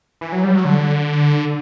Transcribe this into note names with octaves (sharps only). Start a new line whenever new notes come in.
E3
F#3
G3
F#3
D3